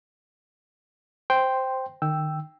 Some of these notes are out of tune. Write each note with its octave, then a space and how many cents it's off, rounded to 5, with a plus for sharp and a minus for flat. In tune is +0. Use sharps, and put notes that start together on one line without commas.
C5 +0 G5 +0 C6 +0
D#3 -25 G5 +0 E6 +0